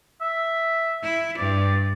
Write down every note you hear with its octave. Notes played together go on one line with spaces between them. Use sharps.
E5
E4
G2 D5